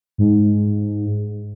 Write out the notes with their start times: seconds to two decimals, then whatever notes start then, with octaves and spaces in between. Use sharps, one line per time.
0.18 G#2